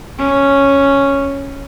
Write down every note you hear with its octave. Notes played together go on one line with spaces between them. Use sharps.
C#4